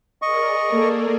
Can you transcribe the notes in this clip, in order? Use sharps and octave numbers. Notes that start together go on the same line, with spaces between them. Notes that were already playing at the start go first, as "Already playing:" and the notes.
G#4 A#4 D5 D#5 C#6
A#3 A4